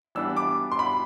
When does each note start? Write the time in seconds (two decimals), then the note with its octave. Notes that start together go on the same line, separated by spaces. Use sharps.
0.15 E3 G3 B3 D4 E6
0.37 D6
0.72 C6
0.79 B5